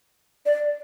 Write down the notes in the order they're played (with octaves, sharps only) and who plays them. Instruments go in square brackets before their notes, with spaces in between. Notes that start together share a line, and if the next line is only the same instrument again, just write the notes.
[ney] D5